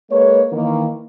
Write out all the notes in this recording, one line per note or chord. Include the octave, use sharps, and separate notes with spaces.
G#3 A#3 B4 C#5
D#3 E3 A#3